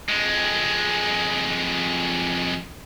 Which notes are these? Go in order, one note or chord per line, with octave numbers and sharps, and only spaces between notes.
F2 G#3